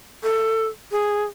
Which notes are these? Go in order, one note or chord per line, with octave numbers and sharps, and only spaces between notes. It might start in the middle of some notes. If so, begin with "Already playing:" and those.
A4
G#4